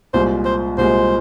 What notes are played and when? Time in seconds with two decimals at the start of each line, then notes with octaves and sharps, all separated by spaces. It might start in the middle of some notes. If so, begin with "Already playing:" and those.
0.14 C2 A#2 G#3 C5
0.45 C5
0.78 C2 A#2 G#3 C5